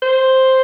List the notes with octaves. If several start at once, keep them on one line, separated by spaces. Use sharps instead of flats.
C5